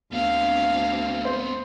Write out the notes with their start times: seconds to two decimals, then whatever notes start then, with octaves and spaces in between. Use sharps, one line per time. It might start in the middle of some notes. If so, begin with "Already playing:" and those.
0.13 D2 B3 C4 F5
1.25 C5